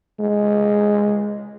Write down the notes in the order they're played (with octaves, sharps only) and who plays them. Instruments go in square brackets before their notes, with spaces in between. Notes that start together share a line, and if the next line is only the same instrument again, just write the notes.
[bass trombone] G#3